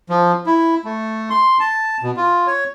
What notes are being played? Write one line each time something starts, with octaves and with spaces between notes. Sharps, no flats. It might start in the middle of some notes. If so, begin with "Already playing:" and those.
F3
E4
A3
C6
A5
B2
F4
C#5